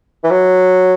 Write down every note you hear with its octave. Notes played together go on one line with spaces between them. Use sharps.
E3
F#3